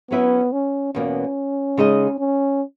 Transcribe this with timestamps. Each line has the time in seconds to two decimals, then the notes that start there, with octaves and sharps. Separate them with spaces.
0.11 F#3 B3 C#4 E4 B4 E5
0.53 C#4
0.94 E2 B2 A#3 C#4
1.77 C#3 G#3 D#4 G#4 D#5
2.18 C#4